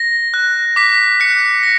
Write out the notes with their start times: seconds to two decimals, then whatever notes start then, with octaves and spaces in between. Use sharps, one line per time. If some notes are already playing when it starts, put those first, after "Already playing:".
Already playing: A#6
0.34 F#6
0.76 D6 B6
1.20 F#6 C#7
1.63 A#6